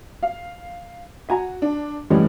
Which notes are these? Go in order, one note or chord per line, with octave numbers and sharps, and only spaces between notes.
F5
F#4 G#5 A#5
D4
A2 E3 G3 G#3 C#4